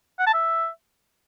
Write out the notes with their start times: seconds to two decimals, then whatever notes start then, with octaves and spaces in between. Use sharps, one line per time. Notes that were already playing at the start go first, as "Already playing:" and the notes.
0.19 F#5
0.27 A5
0.34 E5